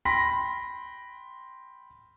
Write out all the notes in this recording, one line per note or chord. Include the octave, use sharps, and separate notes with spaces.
G5 B5 C6 A#6 B6